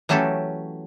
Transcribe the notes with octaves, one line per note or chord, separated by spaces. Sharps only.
E3 F#3 A3 C#4 G4 A4